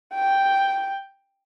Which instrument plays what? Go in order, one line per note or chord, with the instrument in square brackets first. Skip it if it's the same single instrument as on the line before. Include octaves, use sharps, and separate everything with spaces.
[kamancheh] G5